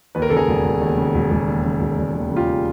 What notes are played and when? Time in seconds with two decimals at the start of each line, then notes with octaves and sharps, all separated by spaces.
0.15 D#2 B4
0.22 A#4
0.30 C#3 A4
0.37 G#4 A#4
0.48 E1
0.65 E1
0.81 D#2
0.98 C#3
1.14 E1
1.31 E1
1.48 D#2
1.64 C#3
1.81 E1
1.98 E1
2.15 D#2
2.31 C#3
2.36 F4 G4